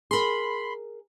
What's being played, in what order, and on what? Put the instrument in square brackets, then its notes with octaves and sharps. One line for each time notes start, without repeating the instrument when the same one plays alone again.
[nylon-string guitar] G#4 A#4 [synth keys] B5 C6